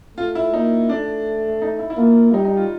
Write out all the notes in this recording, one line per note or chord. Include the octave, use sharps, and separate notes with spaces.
A3 F4
E4
A#3 D#4
A3 D4
D#4
E4
E4
A#3 F4
G3 D#4
D#4
F4